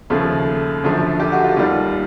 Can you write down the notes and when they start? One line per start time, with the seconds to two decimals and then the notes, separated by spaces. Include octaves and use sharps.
0.10 D#2 C#3 F3 A3
0.83 F#2 D3 F3 A3
1.20 G4
1.32 F#4
1.44 F4
1.56 D#2 D#3 G3